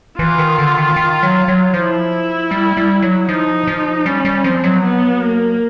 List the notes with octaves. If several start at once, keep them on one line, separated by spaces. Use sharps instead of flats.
E3 F4
D#3
D3
D#3
D#3
F#3
F#3
F3 E4
G3
G3
F#3
F3 D#4
F3
G3 C#4
G3
F3 C4
F#3
B3
A#3